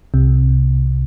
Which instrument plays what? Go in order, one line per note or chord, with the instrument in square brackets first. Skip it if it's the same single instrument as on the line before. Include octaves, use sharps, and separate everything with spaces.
[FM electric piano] C2 C3